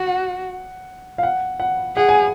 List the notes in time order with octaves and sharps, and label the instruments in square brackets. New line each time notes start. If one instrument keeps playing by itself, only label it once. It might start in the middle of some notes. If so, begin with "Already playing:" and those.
Already playing: [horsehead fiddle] F#4 [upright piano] F#5
[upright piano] F5
F#5
F#5
[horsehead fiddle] G#4 [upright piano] F#5
[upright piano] G#5